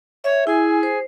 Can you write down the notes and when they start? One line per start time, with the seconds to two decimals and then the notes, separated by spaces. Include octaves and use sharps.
0.24 C#5 E5
0.47 E4 G#4 G#5
0.83 C5